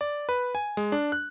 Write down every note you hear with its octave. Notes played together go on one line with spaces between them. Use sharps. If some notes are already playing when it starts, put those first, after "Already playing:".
D5
B4
G#5
G#3
D4
F#6